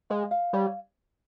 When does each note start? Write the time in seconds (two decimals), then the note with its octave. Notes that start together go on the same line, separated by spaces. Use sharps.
0.10 G#3 F5
0.31 F5
0.53 G3 C#5